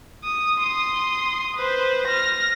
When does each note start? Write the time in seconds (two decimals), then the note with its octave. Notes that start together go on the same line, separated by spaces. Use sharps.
0.24 D#6
0.61 C6 D#6
1.57 B4 C5
2.08 F6 A#6